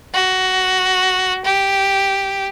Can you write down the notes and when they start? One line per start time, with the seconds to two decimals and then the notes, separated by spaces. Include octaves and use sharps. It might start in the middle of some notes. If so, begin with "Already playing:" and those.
0.13 F#4
1.45 G4